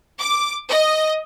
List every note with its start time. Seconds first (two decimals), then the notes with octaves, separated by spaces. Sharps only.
0.21 D6
0.70 D#5